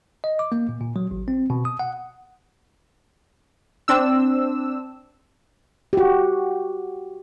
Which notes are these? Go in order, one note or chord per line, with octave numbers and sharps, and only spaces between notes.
D#5
D6
A#3
A#2
A#2
F#3
G#1
C4
B2
D#6
F#5
C4 D4 E6
F#4 G4